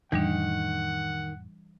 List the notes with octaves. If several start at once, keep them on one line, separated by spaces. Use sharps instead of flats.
F2 A2 D#3 E3 G3 D4 F#5